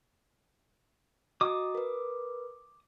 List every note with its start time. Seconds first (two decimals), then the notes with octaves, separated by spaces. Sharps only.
1.41 F#4 D#5 A#5 D6 D#6
1.75 A#4 B4